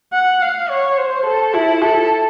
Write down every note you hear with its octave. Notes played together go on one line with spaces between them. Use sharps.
F#5
F5
C#5
C5
A4
E4
A4